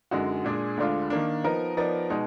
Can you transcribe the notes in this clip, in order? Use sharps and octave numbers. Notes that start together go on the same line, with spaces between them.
F#2 D3 G#3 D#4 F#4
A#2 G#3 D4 G#4 D5
D2 D3 G#3 D4 F4
D#3 A#3 D4
F3 B3 D#4 A#4 D#5
F3 B3 D#4 A#4 D5
B2 G#3 D#4